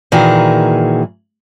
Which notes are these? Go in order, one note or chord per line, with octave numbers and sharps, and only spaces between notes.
A#2 D#3 E3 F#4 G#4